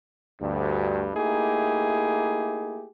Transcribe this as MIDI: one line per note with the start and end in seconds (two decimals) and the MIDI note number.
0.41 1.10 38
0.41 1.10 43
1.15 2.87 57
1.15 2.87 58
1.15 2.87 63
1.15 2.87 64
1.15 2.87 67
1.15 2.87 68